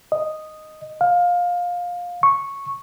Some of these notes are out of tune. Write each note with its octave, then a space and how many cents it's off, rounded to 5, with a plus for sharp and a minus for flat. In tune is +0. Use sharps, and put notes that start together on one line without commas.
D#5 -5
F5 +20
C#6 -5